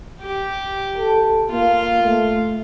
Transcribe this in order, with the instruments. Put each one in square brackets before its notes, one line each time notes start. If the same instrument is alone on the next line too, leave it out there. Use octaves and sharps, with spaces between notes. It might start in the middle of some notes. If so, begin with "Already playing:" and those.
[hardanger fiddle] G4
[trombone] A4
[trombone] A#3 [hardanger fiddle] F4
[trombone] A3